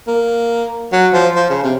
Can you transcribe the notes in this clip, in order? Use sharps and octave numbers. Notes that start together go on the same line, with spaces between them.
A#3
F#3
F3
F3
C#3
C3